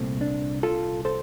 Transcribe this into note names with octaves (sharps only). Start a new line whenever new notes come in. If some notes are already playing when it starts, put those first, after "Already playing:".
Already playing: C2 A#2 A3 C4
D4
F4 A4
A4 C5